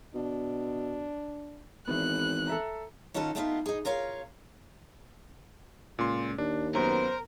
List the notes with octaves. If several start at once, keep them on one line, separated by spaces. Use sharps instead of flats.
B2 D4
G#1 E3 B3 F#6
A4 E5 A#5
D#3 C#4 F4 F#4 A4
A3 B3 C4 D#4 F4
D#4 G#4
F4 A#4 C#5 F5
C#2 A#2 C6
D#2 D4
F#2 B3 A#4 C5